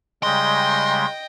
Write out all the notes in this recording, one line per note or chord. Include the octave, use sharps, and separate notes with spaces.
C#3 G3 G#3 D#5 G5 C6